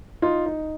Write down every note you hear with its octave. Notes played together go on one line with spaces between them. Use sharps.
D#4 F4
D#4